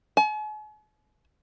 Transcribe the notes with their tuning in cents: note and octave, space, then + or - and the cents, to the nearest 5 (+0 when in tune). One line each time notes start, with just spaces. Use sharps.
G#5 +45